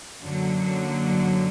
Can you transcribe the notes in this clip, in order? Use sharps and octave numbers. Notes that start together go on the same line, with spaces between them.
F#2 D3 F#3 A#3